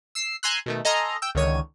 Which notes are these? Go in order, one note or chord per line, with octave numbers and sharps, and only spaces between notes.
E6 C7
G#5 A#5 C6 E6 F#6
B2 D#3 A3
A4 D#5 G#5 A#5 C6 F6
G5 E6
C#2 D3 D#3 C#5 G#6 D#7